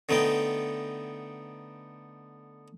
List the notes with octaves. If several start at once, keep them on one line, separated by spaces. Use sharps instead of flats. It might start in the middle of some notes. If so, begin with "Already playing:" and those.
D3 A3 B3 D#4 G5